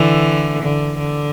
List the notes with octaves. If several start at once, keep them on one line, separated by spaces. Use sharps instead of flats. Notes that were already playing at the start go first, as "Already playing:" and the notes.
Already playing: D3 E3
D3
D3